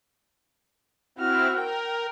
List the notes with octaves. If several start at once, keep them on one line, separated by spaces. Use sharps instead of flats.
C4 E4 F#4 F6
A#4 G5